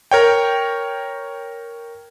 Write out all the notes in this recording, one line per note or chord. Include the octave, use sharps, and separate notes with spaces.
A#4 C#5 G5